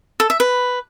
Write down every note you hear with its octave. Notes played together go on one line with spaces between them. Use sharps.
A4
E5
B4